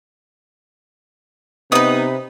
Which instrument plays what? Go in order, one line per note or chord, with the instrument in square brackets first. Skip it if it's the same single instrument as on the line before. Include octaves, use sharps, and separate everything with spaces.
[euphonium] C3 [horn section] B3 D#4 [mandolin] B4 D#6